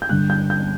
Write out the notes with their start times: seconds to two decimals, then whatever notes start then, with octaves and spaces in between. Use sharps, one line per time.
0.02 G6
0.09 G2 D3 F#6
0.30 G6
0.50 G6